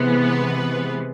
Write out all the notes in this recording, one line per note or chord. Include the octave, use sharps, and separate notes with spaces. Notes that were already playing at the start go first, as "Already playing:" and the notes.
Already playing: C3 E3 G#3 B3
B4